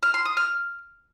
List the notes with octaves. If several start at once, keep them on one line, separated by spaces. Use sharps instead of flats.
F6
C6
D#6
F6